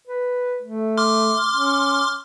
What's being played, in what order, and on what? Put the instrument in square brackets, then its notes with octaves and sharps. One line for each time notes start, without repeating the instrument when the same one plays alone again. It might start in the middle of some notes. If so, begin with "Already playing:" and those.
[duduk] B4
A3
[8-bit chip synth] C6 D6 F6
[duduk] C#4